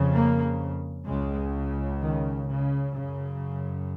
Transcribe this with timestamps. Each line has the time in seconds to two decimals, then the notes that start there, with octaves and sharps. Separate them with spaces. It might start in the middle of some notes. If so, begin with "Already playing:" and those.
Already playing: F2 C#3
0.13 A#3
1.07 C#2 C#3 G#3
2.02 D#3
2.49 C#3
2.96 F#2 C#3